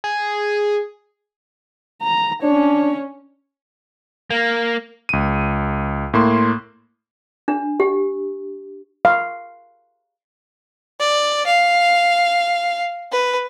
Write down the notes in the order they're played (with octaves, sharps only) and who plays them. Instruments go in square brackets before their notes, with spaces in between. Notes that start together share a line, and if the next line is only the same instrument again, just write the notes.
[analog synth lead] G#4
[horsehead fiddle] A#5
[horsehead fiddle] C#4 C#5 [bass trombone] D4
[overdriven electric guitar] A#3
[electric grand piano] C#2 D#7
A2 A#3 C6
[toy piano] D4
G4
[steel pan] F5
[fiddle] D5
F5
B4